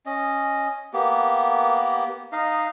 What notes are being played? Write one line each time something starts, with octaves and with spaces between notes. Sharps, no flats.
C#4 D#5
A#3 B3 G4
D#4 D#5 F5